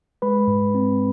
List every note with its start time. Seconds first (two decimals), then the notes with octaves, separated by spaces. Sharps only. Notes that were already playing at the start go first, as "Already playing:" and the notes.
0.22 G#3 B4 B5
0.48 G#2
0.75 C4